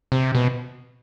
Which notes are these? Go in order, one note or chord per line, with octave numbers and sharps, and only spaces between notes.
C3
B2